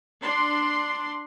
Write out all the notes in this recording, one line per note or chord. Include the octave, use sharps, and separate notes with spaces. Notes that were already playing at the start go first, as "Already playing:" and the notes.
D4 C6